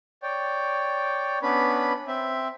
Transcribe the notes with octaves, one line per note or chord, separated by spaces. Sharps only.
C#5 D5 G5
B3 C#4 D4 B4 B5
C4 E5